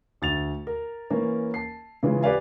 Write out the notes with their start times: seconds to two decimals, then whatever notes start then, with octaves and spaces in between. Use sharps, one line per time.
0.22 D2 A6 F7
0.67 A#4
1.10 E3 A#3 C#4 A#4
1.54 A5 C7
2.03 C#3 E3 G#3 F4
2.23 G4 B4 D5 F5 G#5